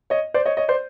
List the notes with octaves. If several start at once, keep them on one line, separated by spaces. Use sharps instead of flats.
C#5 D#5
C5 D5
C#5 D#5
C#5 D#5
C5 D5